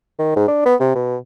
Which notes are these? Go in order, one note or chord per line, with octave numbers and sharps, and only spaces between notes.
D#3
G#2
D4
B3
C3
B2